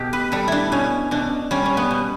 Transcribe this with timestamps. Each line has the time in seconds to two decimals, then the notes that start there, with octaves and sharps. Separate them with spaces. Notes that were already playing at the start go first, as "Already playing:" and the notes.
Already playing: B2 G4 A4
0.13 B4
0.32 G3 A4
0.48 D4 E4
0.72 B2 C#4
1.11 B2 D4
1.51 G3 C#4
1.66 C#4
1.77 B3
1.91 B2